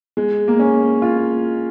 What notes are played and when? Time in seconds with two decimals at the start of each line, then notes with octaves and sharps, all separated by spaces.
0.17 G#3
0.48 A#3
0.59 C#4
1.02 F4